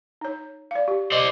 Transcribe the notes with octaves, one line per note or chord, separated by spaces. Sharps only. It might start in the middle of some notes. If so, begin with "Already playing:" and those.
D#4 C#5
D5 F5
G4
C5 D5 D#5